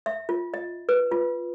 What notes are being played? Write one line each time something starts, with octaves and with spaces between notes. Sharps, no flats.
E5
F4
D#5
B4
F4